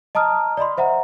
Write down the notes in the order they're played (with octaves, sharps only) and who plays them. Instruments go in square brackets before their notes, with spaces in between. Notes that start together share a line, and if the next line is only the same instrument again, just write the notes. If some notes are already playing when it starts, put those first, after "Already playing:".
[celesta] D#5 A5 A#5 D#6 F6
D5 D#5 B5 C6
C5 E5 F#5 A#5